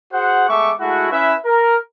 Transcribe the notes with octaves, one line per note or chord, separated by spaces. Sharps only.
F#4 G#4 C5 F#5
G#3 A3 B3 E5 C#6 D6
G#3 A3 E4 F#4
C#4 E4 B4 E5
A#4